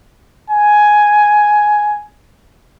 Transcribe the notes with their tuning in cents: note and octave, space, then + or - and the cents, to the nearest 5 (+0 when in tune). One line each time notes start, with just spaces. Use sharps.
G#5 +10